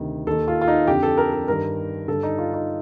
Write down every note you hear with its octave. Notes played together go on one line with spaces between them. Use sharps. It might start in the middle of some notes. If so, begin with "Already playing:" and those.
Already playing: D2 C3 D#3
D#2 D#3 A4
F4
F4
D#4
F2 D3 G4
A4
A#4
A4
G2 D#3 A#4
G2 D3 A4
D#4
F4
D#4